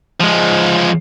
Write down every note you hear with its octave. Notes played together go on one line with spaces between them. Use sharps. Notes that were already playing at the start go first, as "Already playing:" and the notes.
F3 G#3